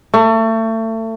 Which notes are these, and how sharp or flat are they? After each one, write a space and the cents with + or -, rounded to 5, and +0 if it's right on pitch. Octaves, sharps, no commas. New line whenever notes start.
A3 +30